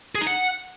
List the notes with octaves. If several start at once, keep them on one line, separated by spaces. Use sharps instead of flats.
G#4
D#4
F#5